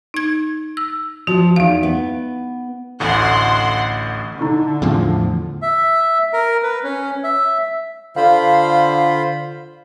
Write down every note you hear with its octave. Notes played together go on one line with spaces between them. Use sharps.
D#4 G#6
E6
F3 F#4
E2 D#4 F5
B3
A1 D2 A2 F#5 C6
D3 D#4 E4 C#6
E2 A2 F3
E5
A#4
B4
C#4
E5
D3 F4 C5 F5 B5